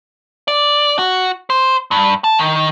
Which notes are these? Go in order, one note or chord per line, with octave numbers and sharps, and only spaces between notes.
D5
F#4
C5
G2
A5
D#3